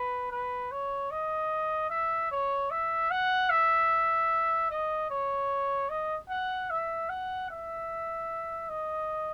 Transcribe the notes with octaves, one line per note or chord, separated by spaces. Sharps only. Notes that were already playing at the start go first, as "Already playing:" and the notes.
Already playing: B4
B4
C#5
D#5
E5
C#5
E5
F#5
E5
D#5
C#5
D#5
F#5
E5
F#5
E5
D#5